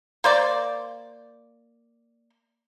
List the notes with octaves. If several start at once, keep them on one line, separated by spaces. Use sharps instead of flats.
A#3 C5 D5